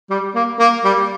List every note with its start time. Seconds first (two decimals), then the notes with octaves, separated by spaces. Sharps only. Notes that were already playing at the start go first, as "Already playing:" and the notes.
0.10 G3
0.35 A#3
0.59 A#3
0.85 G3